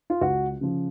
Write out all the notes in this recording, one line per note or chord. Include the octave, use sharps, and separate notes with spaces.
F4
C#2 F#4
C#3 F3